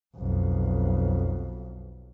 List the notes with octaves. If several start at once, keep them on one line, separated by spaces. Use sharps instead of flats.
B1 F2